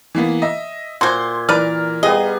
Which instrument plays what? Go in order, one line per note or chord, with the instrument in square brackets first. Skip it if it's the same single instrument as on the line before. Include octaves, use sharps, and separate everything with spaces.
[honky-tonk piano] E3 A#3 B3
D#5 E5
[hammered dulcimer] A#2 [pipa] F#4 C5 [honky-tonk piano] C6 G#6
[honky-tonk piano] E3 F6 [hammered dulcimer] A#4 A#5 [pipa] B4 D5
[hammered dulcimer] G3 B3 F5 [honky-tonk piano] G#4 [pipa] D#5